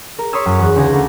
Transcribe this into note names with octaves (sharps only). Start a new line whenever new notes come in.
A#4
C#5 B5 C6 D#6 E6 G#6
F#2
E2 F#6
C#2 D3 D#4 G#5 A#6
D2